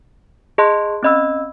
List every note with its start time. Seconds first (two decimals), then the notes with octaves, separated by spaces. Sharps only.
0.58 G#4 D#5 A5 C6 F#6
1.03 C4 C#4 D#5 B5 E6